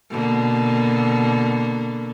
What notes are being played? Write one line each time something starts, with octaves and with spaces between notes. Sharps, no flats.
B2 D3 A#3